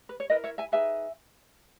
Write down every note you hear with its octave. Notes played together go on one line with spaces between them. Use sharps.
B4
C#5
E4 A#4 B4 D#5
C#5 E5
E5 G#5
D#4 G#4 B4 E5 G#5